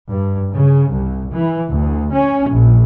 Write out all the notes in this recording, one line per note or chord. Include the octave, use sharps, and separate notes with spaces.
G2
C#3
C2
E3
D2
C#4
A#1